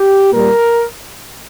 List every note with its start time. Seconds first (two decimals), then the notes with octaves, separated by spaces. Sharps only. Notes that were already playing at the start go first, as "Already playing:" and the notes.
Already playing: G4
0.32 A#2 G3 A#4